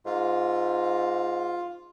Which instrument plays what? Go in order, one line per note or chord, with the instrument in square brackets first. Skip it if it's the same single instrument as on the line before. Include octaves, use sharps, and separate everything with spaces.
[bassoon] G#2 [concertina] F4